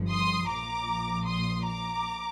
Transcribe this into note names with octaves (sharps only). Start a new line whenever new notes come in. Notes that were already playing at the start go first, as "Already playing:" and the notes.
Already playing: G1 G2 F3
C6 D#6
A#1 A#2 F3 A#5 D6
C6 D#6
A#5 D6